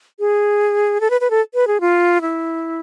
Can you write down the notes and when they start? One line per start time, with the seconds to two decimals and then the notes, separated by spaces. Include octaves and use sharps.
0.20 G#4
1.01 A4
1.10 B4
1.21 B4
1.30 A4
1.54 B4
1.67 G#4
1.81 F4
2.21 E4